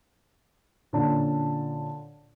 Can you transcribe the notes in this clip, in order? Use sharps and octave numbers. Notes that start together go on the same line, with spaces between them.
A#2 D3 C#4 D5 A5